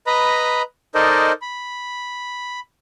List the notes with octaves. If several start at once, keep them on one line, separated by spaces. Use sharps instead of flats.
B4 D#5 A#5 B5
D#4 A4 A#4 C5 D5 D#5
B5